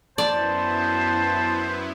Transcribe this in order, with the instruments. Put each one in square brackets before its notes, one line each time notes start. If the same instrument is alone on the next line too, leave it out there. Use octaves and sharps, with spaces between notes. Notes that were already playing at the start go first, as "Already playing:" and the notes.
[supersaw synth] F#2 B3 E4 [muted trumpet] C5 [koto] D5 [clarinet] A5